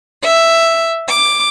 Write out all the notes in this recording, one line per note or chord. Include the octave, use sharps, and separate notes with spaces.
E5
D6